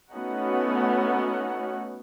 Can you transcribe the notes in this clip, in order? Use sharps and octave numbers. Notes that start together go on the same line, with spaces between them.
A3 B3 C#4 D#4 F#4 F#5